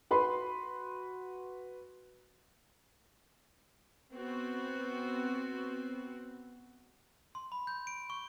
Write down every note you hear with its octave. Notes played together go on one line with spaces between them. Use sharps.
F#4 B4 B5 C6
B3 C4 F#4
C6
B5
G6
D7
C#6